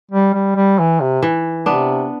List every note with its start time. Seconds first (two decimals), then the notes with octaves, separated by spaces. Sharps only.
0.11 G3
0.33 G3
0.56 G3
0.79 E3
1.01 C3
1.22 E3
1.66 C3 B3 D4